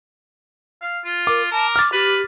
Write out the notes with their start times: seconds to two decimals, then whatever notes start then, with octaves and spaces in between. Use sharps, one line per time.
0.82 F5
1.04 F4
1.27 A#4 D6
1.51 A#4 A5
1.76 D6 F6 A6
1.92 G4 B4